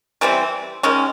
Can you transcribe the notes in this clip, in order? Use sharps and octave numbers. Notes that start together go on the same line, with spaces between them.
C3 E3 G3 C4
D#3 G#3 C#4